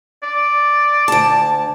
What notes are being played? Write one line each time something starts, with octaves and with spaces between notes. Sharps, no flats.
D5
D2 A5